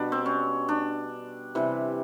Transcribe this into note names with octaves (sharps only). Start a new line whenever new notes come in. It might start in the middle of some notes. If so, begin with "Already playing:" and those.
Already playing: B2 G3 D4
C4
C#4
D4
C3 E3 G3